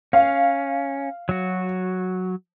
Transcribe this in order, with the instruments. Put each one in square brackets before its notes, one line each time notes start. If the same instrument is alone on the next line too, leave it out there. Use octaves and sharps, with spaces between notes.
[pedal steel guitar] C#4 [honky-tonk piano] F5
[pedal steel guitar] F#3 F#4